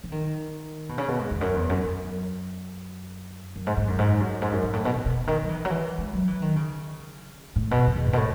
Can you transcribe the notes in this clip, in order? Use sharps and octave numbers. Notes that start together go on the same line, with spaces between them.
E3
D#3
B2
C#3
B2
G#2
E2
F#2
E2
F#2
F#2
F#2
G#2
G#2
F#2
G#2
F#2
G#2
F#2
G#2
A2
B2
A2
B2
C#3
D#3
F#3
E3
F#3
E3
G#3
F#3
E3
D#3
C#3
A2
B2
F#2
E2
G#2
B2
A2